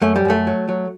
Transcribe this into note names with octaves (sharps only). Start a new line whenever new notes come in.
F#2 A3
G3
F#2 A3
F#3
F#3